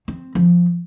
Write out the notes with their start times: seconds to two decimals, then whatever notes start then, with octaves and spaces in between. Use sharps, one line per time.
0.08 C4
0.35 F3